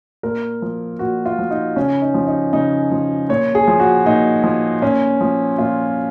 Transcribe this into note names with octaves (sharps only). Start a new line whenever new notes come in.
A#2 A#4
F3
A#2 F#4
F4
F3
D#4
C#3 C#4
D#4
F3
D#4
C#3 D#4
F3
A#2 C#5
G#4
F3
F#4
A#2 D#4
F3
A#2 C#4
F3
A#2 F4